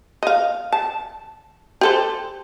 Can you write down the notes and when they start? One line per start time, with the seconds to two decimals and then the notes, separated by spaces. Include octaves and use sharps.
0.23 D#5 F5
0.72 A5
1.81 G4 A4 C5